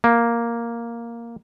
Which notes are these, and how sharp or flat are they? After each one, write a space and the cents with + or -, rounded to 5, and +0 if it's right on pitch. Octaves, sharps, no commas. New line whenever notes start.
A#3 +0